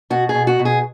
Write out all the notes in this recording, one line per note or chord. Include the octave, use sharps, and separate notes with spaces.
B2 F#4
G#4
B2
F#4
B2
G#4